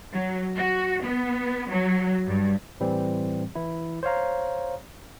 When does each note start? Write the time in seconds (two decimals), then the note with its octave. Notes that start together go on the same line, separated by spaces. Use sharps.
0.14 F#3
0.56 F#4
1.03 B3
1.71 F#3
2.27 G2
2.80 A2 E3 G3 C4
3.55 E3 E4
4.03 C5 C#5 F5 A#5